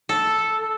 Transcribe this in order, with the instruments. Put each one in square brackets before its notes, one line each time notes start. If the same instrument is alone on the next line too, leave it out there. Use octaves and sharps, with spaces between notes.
[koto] A4